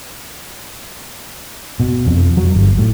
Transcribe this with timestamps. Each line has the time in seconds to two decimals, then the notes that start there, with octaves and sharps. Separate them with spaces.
1.80 B2
2.07 F2
2.37 F#3
2.54 G1
2.78 A2